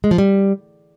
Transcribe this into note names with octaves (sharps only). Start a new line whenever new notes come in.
G#3
F3
G3